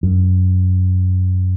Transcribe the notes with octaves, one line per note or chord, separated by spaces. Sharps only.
F#2